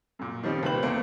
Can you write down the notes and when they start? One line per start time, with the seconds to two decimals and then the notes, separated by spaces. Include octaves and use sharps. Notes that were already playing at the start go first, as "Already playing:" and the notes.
0.19 F#2 A#2
0.43 D#3 F3 G3 C4 C#4
0.62 E1 D#2 G4 B4 C5 F#7
0.83 E2 A3 A#3 C4